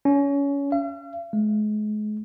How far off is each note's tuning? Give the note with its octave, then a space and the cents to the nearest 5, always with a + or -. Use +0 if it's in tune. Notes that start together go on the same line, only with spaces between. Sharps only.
C#4 +25
F5 -45
G#3 +35